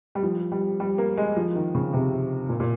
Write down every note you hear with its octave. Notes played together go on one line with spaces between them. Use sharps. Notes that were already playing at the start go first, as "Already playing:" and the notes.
G3
F3
G3
G3
A#3
G#3
F3
D#3
C#3
C3
A#2
A#2